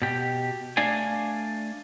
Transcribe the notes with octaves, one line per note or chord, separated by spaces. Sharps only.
B2 G4
A3 D4 D5 F5 G#5